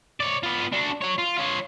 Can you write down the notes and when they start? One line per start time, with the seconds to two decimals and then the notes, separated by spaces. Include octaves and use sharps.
0.20 C#5 D5
0.43 B3 F4
0.72 D4 F#4
1.01 F#4 C#5
1.18 F4
1.38 F4 C#5